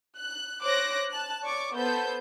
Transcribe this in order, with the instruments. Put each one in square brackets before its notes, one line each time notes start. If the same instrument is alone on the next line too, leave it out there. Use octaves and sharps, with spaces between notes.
[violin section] F#6
C5 C#5 D6 F#6 A#6
A5 F#6
C#5 D5 C#6 D6
B3 A4 C5 G6